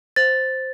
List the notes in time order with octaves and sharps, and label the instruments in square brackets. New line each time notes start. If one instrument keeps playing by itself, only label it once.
[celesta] C5 A6